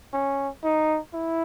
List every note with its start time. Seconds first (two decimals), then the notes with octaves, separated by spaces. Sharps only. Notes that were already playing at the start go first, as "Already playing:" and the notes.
0.13 C#4
0.64 D#4
1.14 E4